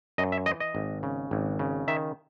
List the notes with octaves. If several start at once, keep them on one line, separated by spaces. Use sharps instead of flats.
F#2 D#5
E5
E3 D#5
D#5
G#1
C#3
G#1
C#3
D#3 E5